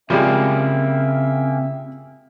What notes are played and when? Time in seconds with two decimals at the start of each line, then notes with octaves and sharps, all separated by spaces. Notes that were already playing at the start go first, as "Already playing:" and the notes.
0.10 C#3 F3 G3 G#3 A#3 C4 E5